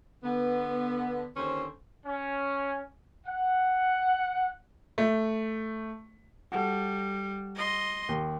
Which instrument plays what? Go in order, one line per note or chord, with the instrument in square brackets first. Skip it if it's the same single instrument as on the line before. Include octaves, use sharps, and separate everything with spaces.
[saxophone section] D3 B3
D#2 D3 C#4 C5
[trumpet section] C#4
F#5
[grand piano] A3
[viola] G3 [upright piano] F#4 A4
[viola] D#5 C6
[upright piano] D#2